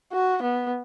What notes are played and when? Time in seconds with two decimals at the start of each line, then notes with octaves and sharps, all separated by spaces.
0.12 F#4
0.42 B3